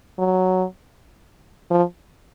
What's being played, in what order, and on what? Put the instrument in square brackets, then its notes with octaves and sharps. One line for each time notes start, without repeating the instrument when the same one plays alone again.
[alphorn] F#3
F3